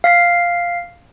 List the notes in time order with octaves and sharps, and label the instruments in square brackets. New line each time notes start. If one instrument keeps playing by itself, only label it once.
[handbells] F5 B6 C7